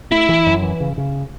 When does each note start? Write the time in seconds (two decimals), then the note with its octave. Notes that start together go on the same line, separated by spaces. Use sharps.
0.11 A3 E4
0.29 E3
0.46 F#2
0.63 E3
0.80 C#3
0.98 C#3